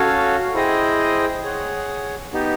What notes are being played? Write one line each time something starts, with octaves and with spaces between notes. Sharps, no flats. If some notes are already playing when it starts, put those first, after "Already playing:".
Already playing: C#4 F#4 A4 C#5 F5
E4 G#4 C5 D#5 G5
G#4 C#5 F#5
B3 D#4 G4